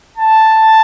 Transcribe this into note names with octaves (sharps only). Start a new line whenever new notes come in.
A5